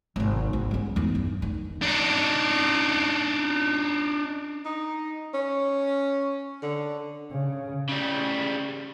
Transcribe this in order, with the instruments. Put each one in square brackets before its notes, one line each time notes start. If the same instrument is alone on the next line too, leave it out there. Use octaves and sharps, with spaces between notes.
[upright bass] G#1 C3
C#2
G#3 C#4
E2 D#3
G2
D#3
[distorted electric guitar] D4 D#4
[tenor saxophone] D#4
C#4
D3
[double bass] C#3
[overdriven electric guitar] C#3 G3